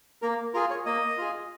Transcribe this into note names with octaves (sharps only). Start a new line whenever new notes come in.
A#3 A#4
F4 G#4 A#4
C#5
A#3 D#5
F4 G#4